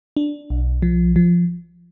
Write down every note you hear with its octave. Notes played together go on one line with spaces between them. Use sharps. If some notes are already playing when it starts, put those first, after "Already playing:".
D4
B1
F3
F3